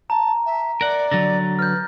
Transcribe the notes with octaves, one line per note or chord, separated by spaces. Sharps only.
A5 A#5
E5
A#4 D5 F#5
D3 F#3 A6 A#6
B4 F6 G6